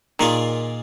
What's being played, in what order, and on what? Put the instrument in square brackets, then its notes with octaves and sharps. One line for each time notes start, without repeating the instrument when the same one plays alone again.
[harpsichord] A#2 A#3 F4 G#4 [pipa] D#3